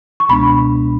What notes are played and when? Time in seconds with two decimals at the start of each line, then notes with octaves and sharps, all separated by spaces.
0.20 C#6
0.29 C#2 B2 G#3 B3 D4 B5